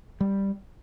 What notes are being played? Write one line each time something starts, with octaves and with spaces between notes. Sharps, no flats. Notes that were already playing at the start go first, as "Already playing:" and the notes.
G3